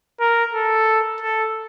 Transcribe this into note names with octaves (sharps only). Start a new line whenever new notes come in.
A#4
A4
A4